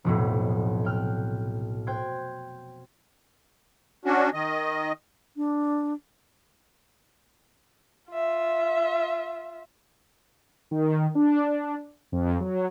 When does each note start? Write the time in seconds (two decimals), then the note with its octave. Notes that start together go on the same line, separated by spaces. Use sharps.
0.04 F1 B1 A2
0.85 G5 F6 F#6
1.87 C5 G5 F#6 G#6
4.05 C#4 D4 F#4
4.34 D#3 D#5
5.37 D4
8.11 F4 E5
10.71 D#3
11.15 D4
12.12 F2
12.40 F#3